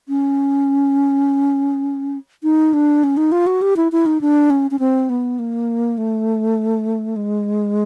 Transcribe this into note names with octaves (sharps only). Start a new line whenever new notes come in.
C#4
D#4
D4
C#4
D#4
F4
F#4
G4
E4
E4
D#4
D4
C#4
C#4
C4
B3
A#3
A3
G#3